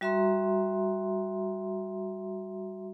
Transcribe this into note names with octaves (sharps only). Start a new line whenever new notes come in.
G3 F#4 E5 A#5 C6